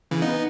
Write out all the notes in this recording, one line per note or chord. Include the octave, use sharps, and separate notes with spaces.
C#3 E3
B3 D#4